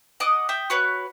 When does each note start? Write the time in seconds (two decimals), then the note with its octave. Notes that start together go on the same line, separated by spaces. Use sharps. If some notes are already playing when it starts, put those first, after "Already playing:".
0.20 D#5 F#5 D6 D#6
0.49 E5 G5 D#6
0.70 F#4 B4 C#5